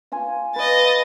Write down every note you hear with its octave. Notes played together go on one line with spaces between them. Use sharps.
F4 F5 G#5
B4 D#5 A6